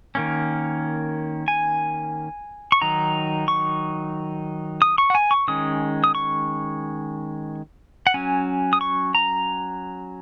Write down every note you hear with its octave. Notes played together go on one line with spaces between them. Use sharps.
D#3 A#3 C#4
G#5
C#6
D#3 F#3 D#4 A#5
C#6
D#6
C#6
F#5
G#5
C#6
D#3 G#3 C#4 D#6
D#6
C#6
F#5
F#3 C#4 G#5
D#6
C#6
A#5